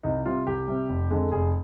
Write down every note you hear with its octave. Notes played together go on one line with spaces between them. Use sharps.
C2 D#4
C3 G3 F4
C2 G4
C3 G3
F1
F2 D3 G#3
F1 G#4